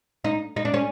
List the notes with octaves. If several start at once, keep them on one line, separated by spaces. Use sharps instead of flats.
D#4
D#4
D4
C#4